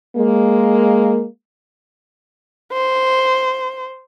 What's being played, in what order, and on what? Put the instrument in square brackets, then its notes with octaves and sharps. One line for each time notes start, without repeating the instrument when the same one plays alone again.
[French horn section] G#3 A#3
[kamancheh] C5